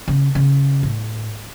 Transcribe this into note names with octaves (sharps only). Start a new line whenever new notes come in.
C#3
C#3
A2